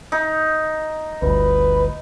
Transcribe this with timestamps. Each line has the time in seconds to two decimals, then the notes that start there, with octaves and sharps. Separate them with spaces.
0.12 D#4
1.22 G1 D2 B4